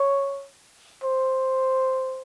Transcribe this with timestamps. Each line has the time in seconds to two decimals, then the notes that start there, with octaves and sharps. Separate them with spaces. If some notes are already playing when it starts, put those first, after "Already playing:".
Already playing: C#5
1.04 C5